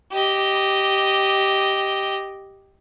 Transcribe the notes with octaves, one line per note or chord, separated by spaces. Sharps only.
G4 D#5